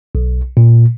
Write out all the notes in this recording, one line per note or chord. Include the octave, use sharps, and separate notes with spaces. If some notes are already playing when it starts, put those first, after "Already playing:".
B1
A#2